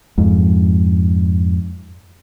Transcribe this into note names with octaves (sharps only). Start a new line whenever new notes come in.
F2 G#2